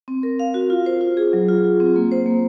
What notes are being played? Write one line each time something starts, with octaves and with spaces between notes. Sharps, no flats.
C4
A#4
F5
F#4
F4
C5
F4
G#4
F#3
F4
F#3
C4
A#3
C5
A#3